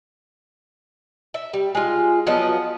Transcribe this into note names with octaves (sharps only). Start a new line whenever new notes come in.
E5
G3
G#3 F4
F3 F#3 B3 D#5